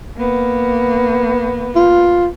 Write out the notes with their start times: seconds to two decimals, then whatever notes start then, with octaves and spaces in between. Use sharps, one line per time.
0.17 A#3 B3
1.75 F4